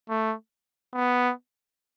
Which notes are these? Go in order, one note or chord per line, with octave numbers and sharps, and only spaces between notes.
A3
B3